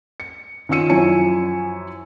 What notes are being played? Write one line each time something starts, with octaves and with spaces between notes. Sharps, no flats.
C#7
D#3 C#4 F4 E6 C#7 D#7
F#2 F3 E4 C#5 G#5 C#7